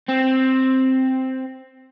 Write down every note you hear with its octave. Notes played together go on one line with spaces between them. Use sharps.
C4